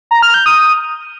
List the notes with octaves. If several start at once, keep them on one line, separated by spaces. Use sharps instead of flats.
A#5
F6
G6
D#6